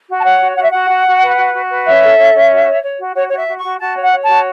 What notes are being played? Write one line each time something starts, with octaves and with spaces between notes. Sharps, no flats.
F#4
A5
C#5 F#5
F#4
F#4 F#5
E5
F#4 F#5
F#4
F#4
B4
F#4
F#4
B4
C#4 E5
A4
C#4
C#4
F#4
C#5
C#5
F#4
F#4 C#5
C#5
F#4
E5
F#4
C#6
F#4
F#4 A5
C#5
F#5
C#5
F#4 A5